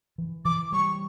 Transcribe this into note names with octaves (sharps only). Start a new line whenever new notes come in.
E3
E3 D6
G3 C#6